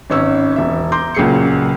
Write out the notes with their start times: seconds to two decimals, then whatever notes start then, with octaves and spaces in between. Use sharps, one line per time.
0.10 G#1 C#4 E6
0.56 E1 E5
0.92 A#5 C6 D6 G6
1.15 C#2 A#2 F#3 G#4 C7 C#7